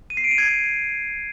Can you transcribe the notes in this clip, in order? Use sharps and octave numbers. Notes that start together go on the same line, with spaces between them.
D#7
C7
D7
D#7
G#6